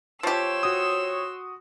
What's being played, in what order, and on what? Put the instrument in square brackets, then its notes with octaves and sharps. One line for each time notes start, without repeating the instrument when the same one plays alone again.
[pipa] F3 G4 [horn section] C#5 [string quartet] C6 E6
[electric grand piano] F#4 D#6